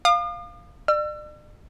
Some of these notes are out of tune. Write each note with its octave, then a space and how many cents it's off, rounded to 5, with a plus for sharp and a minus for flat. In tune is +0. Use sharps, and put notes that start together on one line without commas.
F5 +0 D#6 -45
D5 +45 E6 +40